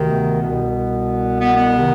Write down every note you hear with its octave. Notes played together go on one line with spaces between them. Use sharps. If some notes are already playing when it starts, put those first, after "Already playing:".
Already playing: D2 C3 D#3
B3
C2 B2
B3
B3
C3 D#3